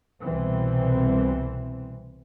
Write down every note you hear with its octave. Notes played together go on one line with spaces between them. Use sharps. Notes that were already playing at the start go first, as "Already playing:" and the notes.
C2 B2 E3 C4